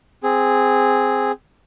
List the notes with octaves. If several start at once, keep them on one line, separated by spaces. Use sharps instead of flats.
C4 G#4